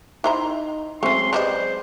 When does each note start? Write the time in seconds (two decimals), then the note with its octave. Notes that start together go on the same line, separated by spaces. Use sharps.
0.24 D#4 E4 C5 A#5
1.03 F#3 G#3 A3 C4 C#4 G#4 C6
1.33 F3 G3 B4 C5 D5 D#5